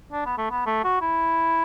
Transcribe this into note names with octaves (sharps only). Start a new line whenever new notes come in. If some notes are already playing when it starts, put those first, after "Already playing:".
D4
B3
A3
B3
A3
F#4
E4